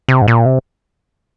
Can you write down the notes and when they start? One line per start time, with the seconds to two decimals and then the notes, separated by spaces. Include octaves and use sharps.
0.09 C3
0.22 G#2
0.28 A#2
0.46 C3